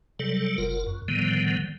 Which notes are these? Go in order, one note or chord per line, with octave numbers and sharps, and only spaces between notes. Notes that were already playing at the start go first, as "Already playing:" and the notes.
C3 F#3 G3 A4
F#1 F4 A#4
F#2
A2 D3 D#3 F3 G3 B3